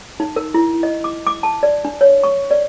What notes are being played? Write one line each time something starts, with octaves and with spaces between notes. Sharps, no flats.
D#4
A#4
E4
D#5
D6
D6
A5
D5
D4
C#5
C#6
D5